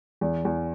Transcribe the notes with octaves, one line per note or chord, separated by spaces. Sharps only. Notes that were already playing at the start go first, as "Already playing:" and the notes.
E2
E2